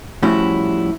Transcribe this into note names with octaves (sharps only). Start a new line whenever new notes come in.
A2 F3 G3 C#4 E4 F#4